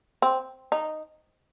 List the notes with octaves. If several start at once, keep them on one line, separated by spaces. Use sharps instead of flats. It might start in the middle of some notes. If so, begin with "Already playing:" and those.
C4
D#4